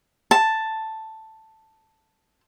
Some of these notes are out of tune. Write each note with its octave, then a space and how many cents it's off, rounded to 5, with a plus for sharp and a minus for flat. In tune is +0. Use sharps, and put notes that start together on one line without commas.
A5 +5